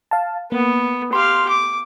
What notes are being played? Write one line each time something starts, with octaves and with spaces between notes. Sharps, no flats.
F5 A5
A#3 B3
G4 F5 C6
D6